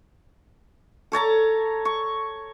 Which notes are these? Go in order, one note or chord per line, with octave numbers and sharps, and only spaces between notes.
A4 C#5 A5 A#5
C#6